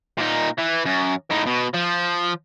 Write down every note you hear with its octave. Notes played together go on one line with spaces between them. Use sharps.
A#2 D#4
E3
F#2
A2 D#4
B2
F3